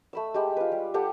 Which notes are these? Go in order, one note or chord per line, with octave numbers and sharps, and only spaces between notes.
A3 B5 E6
G#3 G4 B5
F4 B4
G3
G4 A4 F#5 G5